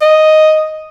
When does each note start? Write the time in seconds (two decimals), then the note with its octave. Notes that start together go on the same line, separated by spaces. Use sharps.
0.02 D#5